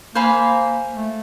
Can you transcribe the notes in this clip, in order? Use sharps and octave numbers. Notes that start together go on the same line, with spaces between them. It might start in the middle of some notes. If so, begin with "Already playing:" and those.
A#3 C5 F5 G#5 B5
A3